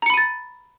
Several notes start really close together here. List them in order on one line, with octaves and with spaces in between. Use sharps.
A#5 C#7 B5 D#7 A6